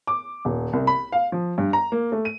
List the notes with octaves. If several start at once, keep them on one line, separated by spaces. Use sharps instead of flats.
D6
D#1
C2
B5
F5
F3
G2
A#5
A#3
A3
D#7